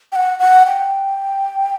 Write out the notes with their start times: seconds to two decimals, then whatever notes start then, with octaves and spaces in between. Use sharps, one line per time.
0.12 G5
0.16 F#5
0.39 F#5
0.66 G5